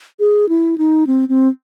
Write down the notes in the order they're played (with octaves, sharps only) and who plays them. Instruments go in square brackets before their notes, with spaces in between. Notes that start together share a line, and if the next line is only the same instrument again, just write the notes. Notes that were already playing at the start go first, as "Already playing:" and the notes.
[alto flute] G#4
E4
D#4
C4
C4